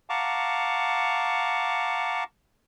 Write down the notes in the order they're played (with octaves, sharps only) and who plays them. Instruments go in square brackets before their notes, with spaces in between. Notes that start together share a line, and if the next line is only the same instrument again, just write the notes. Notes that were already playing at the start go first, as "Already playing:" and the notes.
[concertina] F5 F#5 A5 A#5 C#6 D6